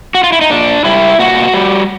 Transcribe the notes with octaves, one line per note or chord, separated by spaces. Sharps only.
F#4
F4
E4
D#4
A#2 D4
G3 E4
A#2 F#4
G3